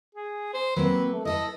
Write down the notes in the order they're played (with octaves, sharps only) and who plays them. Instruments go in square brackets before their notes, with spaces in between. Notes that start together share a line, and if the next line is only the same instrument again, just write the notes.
[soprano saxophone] G#4
C5
[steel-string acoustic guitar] F#3 A#3 C4 [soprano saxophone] B4
[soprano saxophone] A3
[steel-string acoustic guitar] E4 A4 B4 [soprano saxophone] D#5